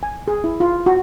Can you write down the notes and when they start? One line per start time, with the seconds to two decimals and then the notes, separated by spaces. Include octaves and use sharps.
0.03 G#5
0.28 G#4
0.44 E4
0.60 F4
0.86 F#4